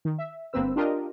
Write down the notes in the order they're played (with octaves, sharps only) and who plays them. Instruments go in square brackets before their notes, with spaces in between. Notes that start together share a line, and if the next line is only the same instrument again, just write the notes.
[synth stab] D#3
E5
G1 A#3 C4 B4 E6
D4 F4 G4 A#4 D#5